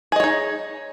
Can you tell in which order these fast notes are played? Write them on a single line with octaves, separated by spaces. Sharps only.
G#4 D#5 C#5 D#4